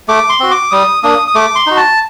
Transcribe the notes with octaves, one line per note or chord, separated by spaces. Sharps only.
A3 D6
C6
C4 F#4
D6
G3 D#6
A#3 D4 D#6
D#6
A3 D6
C6
D#4 F#4
A5